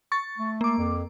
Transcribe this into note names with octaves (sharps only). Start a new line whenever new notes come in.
C#6 A6
A3
A#3 D6
F2